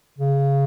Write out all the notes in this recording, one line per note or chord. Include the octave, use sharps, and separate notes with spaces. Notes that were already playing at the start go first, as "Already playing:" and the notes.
C#3